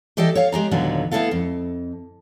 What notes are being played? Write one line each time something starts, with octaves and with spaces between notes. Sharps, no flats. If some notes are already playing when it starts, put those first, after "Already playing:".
E3 G4 A4 D5 D#5 G5
C#5 F5
G#3 G4 G#4 A#5
D#2 A#2 D3 F#3 B3
A3 B3 D4 E4 A4 F5
F2